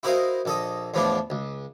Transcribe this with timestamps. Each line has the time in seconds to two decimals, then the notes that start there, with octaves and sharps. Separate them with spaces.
0.03 E4 F#4 A#4 C5 D#5 F5
0.45 A#1 A4 D#5
0.94 E2 A2 F3 B3 D4
1.30 C#2